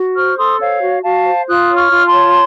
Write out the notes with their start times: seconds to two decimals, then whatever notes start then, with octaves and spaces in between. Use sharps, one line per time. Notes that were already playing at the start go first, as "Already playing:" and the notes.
Already playing: F#4
0.15 C5 C#6 F6
0.37 A4 C6 D#6
0.59 C5 C#5 F5
0.81 F#4
1.03 F#4 F5 A5
1.25 C5
1.47 F4 D#6 F#6
1.69 C#5
1.76 C#6 F6
1.91 F4
2.05 A5 C6
2.13 C#5